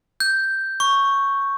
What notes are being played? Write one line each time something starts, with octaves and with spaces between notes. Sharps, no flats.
G6
C#6